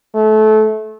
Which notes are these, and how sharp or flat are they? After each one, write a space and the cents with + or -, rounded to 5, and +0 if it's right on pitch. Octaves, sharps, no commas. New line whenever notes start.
A3 -25